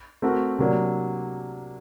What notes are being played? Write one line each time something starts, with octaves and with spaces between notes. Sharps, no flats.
A3 C4 F#4 A#4
C3 F#3 A#3 D4